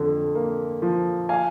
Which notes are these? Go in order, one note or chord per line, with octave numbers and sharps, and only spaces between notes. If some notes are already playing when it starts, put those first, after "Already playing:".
Already playing: F2 D3
A#3
F3
F5 G#5